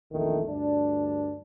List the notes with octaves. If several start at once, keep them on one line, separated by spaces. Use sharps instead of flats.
A#1 E2 D#3 A3
D2 G2 D4